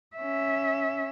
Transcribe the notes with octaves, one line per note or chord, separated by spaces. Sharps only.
C#4 E5